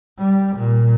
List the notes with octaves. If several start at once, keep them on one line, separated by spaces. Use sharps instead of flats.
G3
A#2